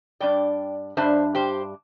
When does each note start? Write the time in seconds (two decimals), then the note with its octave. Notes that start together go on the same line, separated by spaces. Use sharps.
0.20 G2 G3 D4 D5 G5
0.97 G2 G3 D4 C5 E5
1.35 G4 C5